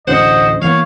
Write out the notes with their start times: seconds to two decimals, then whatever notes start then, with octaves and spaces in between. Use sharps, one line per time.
0.07 A1 D2 D4 C5 D#5 F#5
0.62 E3 A#3 B3 C#5 F5